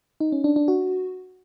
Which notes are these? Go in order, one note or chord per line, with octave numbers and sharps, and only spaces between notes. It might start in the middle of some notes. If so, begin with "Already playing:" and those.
D#4
C#4
D4
D4
F#4